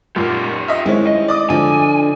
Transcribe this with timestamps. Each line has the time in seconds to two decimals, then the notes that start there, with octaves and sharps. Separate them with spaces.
0.16 F#2 A#2 F4 G4
0.68 D#5 E5
0.85 D#3 G#3 C4 C#4 E4
1.07 D#5
1.28 D5 D6 D#6
1.50 D3 F3 G#5